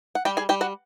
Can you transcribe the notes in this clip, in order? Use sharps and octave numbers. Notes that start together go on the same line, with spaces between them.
F#5
G3 G4 G5
G#4 G#5
G3 G4 G5
F#4 F#5